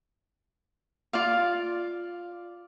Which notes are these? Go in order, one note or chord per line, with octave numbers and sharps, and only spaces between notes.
F4 D5 F5